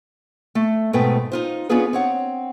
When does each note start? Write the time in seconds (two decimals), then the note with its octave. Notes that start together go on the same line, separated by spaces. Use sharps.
0.55 A3
0.93 G#2 B2 A3 B3 B4 G5
1.32 D#4 F4 C5
1.69 B3 C#4 D4 F4 G#4 B4
1.93 C4 C#5 F#5